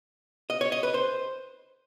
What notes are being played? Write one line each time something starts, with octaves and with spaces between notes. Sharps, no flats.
D#5
C#5
D#5
B4
C5